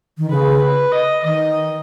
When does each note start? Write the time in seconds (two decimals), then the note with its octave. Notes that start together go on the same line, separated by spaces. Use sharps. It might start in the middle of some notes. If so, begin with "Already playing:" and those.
0.18 D#3
0.30 C#3 B4
0.62 B4
0.92 D#5
1.23 D#3 D#5